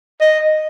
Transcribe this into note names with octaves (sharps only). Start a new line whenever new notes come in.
D#5